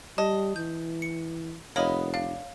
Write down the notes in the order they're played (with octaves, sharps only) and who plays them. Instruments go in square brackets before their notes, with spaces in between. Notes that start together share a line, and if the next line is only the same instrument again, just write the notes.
[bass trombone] G3 [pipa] D#5 [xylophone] A5
[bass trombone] E3 [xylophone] G6
[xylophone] C#7
[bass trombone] F1 [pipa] A#3 B3 D#5 [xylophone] C#5 B5
[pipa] D4 [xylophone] F5